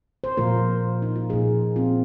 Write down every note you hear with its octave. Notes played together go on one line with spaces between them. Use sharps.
C5
A#2 F3 A#3 F4 A#4
D#4
F4
A#2 F3 A#3 D#4 G#4
C4 F4